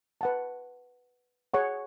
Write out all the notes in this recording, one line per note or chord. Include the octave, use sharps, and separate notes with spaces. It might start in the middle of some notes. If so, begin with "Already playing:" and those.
B4 F#5 A5
G#4 C#5 F#5 C#6